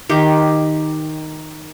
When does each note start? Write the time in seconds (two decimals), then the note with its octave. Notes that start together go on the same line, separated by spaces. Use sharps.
0.09 D#3 G4